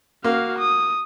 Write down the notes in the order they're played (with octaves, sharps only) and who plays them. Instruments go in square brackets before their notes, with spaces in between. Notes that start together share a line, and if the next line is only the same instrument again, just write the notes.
[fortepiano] A#3 [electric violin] F#4 F5
[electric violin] D#6